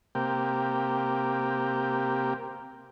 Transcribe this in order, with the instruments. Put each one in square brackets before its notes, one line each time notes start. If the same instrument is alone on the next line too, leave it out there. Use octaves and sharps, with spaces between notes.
[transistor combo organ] C3 A#3 G4